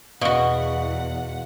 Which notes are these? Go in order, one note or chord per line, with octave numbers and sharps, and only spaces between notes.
E2 B2 F#4 F5 F#5